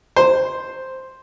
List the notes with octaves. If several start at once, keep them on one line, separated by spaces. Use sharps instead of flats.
C5